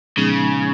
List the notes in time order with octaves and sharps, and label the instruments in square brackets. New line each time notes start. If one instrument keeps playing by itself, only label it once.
[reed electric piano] A#2 F3 G#3 B3 D#4 [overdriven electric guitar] C#3